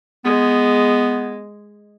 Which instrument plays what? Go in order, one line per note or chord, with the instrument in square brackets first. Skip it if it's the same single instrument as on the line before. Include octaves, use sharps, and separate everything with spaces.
[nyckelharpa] G#3 [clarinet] B3